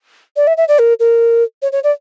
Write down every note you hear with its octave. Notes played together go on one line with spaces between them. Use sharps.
D5
E5
E5
D5
A#4
A#4
C#5
C#5
D5